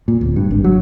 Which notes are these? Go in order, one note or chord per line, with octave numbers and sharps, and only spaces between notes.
A#2
D1
G2
G#1
F#3